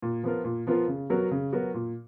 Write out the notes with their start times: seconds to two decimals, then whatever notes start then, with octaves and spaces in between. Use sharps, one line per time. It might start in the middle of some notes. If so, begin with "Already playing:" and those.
0.02 A#2
0.23 F3 B3 F4 A#4
0.44 A#2
0.67 F3 B3 F4 A#4
0.88 C#3
1.10 F#3 B3 F#4 A#4
1.31 C#3
1.52 F#3 B3 F#4 A#4
1.74 A#2